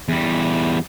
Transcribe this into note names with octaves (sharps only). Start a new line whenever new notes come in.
E2 G3